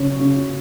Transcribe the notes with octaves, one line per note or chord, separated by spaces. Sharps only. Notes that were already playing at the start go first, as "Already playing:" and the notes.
Already playing: C#3 F#3 C#5
C#3